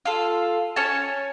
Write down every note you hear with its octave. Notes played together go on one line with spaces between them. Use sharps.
F4 A4
C#4 C#5 G#5 A5